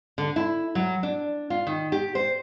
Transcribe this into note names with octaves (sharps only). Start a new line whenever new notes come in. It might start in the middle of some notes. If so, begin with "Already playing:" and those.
D3
E4
F#3
D4
F4
D#3
G4
C5